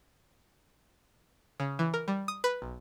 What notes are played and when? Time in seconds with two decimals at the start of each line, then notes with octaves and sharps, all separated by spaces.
1.60 C#3
1.79 E3
1.94 A#4
2.08 G3
2.28 D#6
2.44 B4
2.62 B1